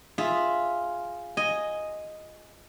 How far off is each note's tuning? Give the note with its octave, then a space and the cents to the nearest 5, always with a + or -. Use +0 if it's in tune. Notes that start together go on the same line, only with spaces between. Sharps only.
F4 +0 G#4 +0 E5 +0
D#5 +0 G#5 +0